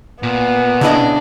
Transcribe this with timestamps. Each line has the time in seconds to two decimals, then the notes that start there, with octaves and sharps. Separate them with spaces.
0.23 A#2 B3
0.81 C#3 D4 E4 D#5